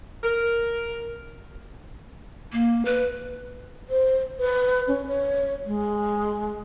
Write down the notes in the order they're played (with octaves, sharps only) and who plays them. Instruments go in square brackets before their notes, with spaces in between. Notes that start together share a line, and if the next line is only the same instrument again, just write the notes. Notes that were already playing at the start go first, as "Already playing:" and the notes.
[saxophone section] A#4
[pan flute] A#3
B4
[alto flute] C5
B4
C#4
C#5
G#3